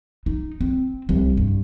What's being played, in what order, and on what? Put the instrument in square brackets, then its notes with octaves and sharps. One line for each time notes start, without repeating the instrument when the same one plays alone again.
[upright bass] D#4
C4
C2 G3
G2